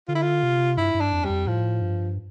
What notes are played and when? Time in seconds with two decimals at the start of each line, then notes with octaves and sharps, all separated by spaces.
0.08 D3 F4
0.15 E4
0.22 F4
0.43 C3
0.78 G2 E4
0.94 G2
1.00 D4
1.13 F2
1.24 G3
1.29 F2
1.47 A2 F3
1.82 G2